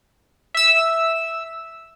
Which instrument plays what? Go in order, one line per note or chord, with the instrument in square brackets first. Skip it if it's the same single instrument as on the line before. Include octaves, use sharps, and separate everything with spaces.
[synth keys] E5 E6